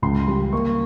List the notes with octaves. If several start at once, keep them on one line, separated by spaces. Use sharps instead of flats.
C#2 C6
G3
A#3 C#6